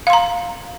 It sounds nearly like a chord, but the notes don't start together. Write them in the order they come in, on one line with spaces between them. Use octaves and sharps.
F5 C6 A#5